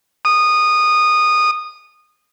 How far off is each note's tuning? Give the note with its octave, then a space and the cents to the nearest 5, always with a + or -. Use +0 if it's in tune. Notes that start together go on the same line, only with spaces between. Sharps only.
D#6 -15